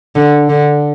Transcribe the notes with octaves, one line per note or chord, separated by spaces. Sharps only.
D3
D3